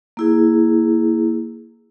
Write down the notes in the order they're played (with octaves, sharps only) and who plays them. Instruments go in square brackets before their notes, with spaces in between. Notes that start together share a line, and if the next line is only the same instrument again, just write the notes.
[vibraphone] A#3 E4 G#4